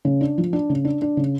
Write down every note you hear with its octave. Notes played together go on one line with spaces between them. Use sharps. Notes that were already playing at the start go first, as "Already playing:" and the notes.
C#3
D4
F3
D4
C#3
D4
D4
C#3